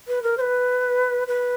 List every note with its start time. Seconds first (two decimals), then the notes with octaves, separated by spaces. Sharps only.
0.08 B4
0.23 A#4
0.38 C5
0.41 B4
1.28 B4